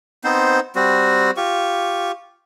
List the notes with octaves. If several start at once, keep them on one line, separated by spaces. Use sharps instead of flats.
B3 C4 D#4 C5
G3 C4 F#4
F4 G4 C#6